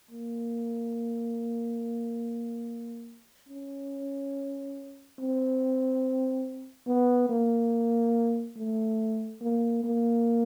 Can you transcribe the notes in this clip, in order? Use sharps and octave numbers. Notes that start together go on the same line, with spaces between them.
A#3
C#4
C4
B3
A#3
A3
A#3
A#3